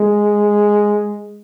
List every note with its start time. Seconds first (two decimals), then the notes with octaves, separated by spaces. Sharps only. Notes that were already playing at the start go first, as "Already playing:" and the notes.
Already playing: G#3